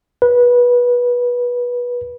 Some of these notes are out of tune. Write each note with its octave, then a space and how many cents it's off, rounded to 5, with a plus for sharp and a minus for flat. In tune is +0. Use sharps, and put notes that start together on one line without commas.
B4 -20